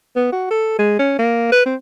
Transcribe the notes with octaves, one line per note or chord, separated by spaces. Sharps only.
B3
F#4
A4
G#3
C#4
A#3
B4
C4